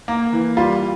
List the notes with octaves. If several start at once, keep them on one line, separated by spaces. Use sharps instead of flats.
A#3
E3
G3 F4